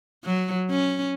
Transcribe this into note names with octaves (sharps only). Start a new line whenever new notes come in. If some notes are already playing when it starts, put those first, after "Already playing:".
F#3
C#4